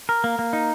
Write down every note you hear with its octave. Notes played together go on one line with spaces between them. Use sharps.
A#4
A#3
A#3
D#4